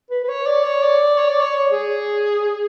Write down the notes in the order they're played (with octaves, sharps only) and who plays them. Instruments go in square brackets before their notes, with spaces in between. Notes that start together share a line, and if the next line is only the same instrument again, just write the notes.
[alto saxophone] B4
B4
C#5
D5
C#5
D5
C#5
D5
C#5
G#4